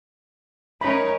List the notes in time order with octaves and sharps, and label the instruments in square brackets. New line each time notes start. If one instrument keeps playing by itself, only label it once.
[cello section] C#4 D#4 A#4 [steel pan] B5